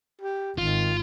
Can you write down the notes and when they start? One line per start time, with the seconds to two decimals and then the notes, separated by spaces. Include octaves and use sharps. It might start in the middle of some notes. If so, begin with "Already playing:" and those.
0.21 G4
0.58 G#1 D#3 F4